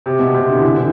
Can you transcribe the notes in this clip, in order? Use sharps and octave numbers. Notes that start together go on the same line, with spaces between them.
C3
B2
C3
D3
E3
D3
E3